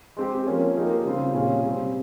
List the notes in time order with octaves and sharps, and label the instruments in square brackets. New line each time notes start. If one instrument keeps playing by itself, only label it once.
[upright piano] G#3 C4 G4
F3 A#3 C#4
F3 A#3 D#4 G4
C#3 G3 C4 F4
A#2 G3 C#4 F4 G#4
C3 G3 C4